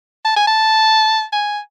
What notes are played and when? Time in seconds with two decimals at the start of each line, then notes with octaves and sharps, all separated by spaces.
0.25 A5
0.36 G#5
0.47 A5
1.32 G#5